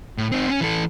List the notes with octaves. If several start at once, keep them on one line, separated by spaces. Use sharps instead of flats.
A2
C4 D#4
C#4
E3 A4